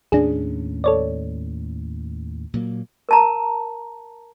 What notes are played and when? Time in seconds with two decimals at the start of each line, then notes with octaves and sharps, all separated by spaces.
0.12 D#2 A2 C#4 D4 G#4
0.84 A4 C#5 D5
2.54 A#2 F#3 A#3
3.09 A#4 A5 A#5